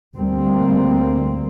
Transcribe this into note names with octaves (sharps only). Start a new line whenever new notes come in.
D2 G3 A#3 C4